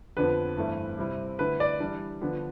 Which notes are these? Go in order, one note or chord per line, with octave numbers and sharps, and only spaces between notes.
F2 D3 F3 B3 D4 B4
G2 E3 A3 C4 E4
C3 G3 C4 E4
D3 A3 E4 B4
D5
E3 G3 D4
D3 F3 B3 D4